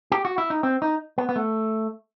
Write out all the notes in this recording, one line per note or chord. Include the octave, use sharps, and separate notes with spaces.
G4
F#4
E4
D#4
C4
D#4
B3
B3
A3